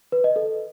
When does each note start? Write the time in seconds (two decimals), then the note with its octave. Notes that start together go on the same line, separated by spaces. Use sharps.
0.12 B4
0.24 D#5
0.36 A4